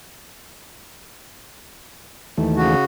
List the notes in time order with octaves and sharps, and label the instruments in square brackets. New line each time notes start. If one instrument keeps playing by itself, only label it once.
[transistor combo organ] D#2 E3 A3
[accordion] C#3 F#4